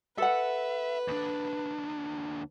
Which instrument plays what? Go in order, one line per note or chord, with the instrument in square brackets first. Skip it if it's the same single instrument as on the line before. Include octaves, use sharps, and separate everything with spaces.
[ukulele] A4 F#5 [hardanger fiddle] B4 [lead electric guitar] E5
[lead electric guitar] D#2 D4